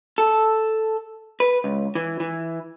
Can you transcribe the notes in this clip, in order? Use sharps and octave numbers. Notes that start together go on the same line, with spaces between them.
A4
B4
C#2
E3
E3